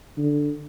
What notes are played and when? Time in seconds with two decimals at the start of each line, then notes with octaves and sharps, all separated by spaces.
0.18 D3